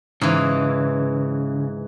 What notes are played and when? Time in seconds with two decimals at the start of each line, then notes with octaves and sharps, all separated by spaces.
0.22 G#2 C#3 E3